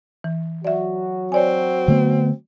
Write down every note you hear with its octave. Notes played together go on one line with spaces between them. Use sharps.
E3
F#3 F#4 D5 E5
C4 C#5 D5 G#5
D3 A3 B3